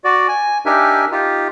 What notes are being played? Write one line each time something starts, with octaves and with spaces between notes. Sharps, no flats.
F#4 D5
G#5
D4 D#4 G4 A#4 E5 G#5
D#4 F4 G4